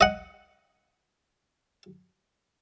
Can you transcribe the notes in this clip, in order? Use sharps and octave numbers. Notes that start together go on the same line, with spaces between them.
D#5 F#5